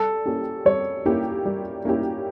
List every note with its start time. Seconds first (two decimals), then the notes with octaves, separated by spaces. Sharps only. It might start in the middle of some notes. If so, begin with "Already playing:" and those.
Already playing: G3 A4
0.25 A#3 C#4 E4 G4
0.65 G3 C#5
1.06 A#3 C#4 E4 G4
1.45 G3
1.85 A#3 C#4 E4 G4